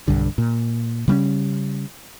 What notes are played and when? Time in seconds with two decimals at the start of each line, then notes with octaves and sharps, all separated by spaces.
0.08 B1 G2 D3
0.38 A#2
1.08 C#3 G3 C4 C#4